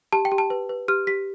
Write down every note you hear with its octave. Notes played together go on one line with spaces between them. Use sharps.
G4 A5
G5
G4
A5
B4
B4
G4 F6
G4 B6